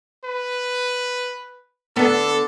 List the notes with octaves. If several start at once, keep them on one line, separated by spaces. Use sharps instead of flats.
B4
D3 B3 A4